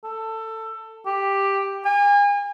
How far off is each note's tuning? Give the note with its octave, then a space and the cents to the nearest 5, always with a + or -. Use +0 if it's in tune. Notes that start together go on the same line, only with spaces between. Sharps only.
A4 +20
G4 +5
G#5 -35